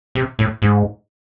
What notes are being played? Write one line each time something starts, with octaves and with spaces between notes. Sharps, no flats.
C3
A2
G#2